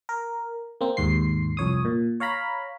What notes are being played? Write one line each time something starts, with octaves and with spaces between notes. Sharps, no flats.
A#4
A#3 C4
D#2 G#2 C6 C7
C2 F2 C#5 D#6
A#2
C#5 F5 A#5 B5